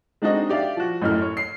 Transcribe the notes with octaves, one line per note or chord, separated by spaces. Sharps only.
G#3 C4 D4 D#4 F#4 D#5
G4 D5 E5 F5
F3 F#4
A1 F#2 A2 A3 F6
C#5
C7